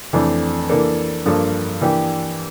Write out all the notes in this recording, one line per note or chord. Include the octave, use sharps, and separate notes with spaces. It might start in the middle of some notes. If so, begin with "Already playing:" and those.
F2 E3 A3 D4
E3 A#3 D4 A4
G2 F3 A#3 D4 A4
E3 A#3 D4 G4